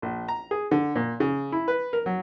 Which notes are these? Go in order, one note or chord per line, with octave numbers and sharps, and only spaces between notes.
A#1
A#5
G#4
D3
A#2
C#3
E4
B4
A#4
F#3